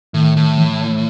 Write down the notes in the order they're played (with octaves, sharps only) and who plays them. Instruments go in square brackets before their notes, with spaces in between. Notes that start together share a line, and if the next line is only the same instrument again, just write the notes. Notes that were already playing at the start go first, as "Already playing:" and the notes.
[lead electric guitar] A2 [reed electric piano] D#3
[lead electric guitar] A2
[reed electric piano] E3